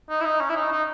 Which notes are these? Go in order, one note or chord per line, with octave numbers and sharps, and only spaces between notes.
D#4
E4
D#4
C#4
E4
D#4
D#4